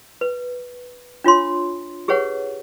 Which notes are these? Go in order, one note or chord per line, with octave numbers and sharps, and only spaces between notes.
B4
D4 F4 C#5 C6
G4 G#4 B4 C#5 F#5